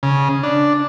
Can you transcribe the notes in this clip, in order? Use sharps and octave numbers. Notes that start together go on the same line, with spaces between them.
C#3
D4